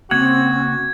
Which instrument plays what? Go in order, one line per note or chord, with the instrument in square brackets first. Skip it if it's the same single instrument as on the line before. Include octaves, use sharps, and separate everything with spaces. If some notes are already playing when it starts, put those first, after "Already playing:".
[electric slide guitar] C#3 A#3 F#5 [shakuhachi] C4 [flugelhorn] F#4 [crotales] G#6